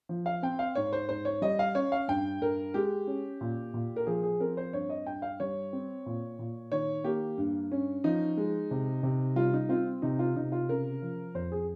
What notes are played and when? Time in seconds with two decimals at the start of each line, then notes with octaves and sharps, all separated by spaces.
0.09 F3
0.26 F5
0.43 C4 G5
0.59 F5
0.75 G#2 C#5
0.93 C5
1.09 G#2 C5
1.25 C#5
1.42 G3 D#5
1.59 F5
1.75 C#4 C#5
1.92 F5
2.08 G2 G5
2.41 G2 A#4
2.74 G#3 G4
3.07 C#4
3.41 A#2
3.74 A#2
3.96 A#4
4.07 F3 G#4
4.23 G#4
4.40 C4 A#4
4.57 C5
4.73 G2 C#5
4.90 D#5
5.06 G2 G5
5.22 F5
5.40 G3 C#5
5.73 C4
6.06 A#2
6.39 A#2
6.71 D#3 C#5
7.04 A#3 G4
7.38 G2
7.72 C#4
8.04 F3 D#4
8.37 G#3
8.71 C3
9.03 C3
9.36 G3 F4
9.53 D#4
9.69 C4 F4
10.02 C3 D#4
10.19 F4
10.36 C3 D#4
10.52 F4
10.69 C#3 A#4
11.02 F3
11.34 F2 C5
11.52 G#4